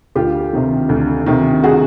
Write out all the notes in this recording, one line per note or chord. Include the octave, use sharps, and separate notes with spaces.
D2 F4 G4
C3 D#3
D2
C3 D#3
F#4 G#4